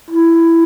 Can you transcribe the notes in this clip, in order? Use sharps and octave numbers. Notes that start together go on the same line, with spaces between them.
E4